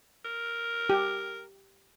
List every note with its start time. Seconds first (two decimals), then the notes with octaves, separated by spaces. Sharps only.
0.25 A#4
0.89 G4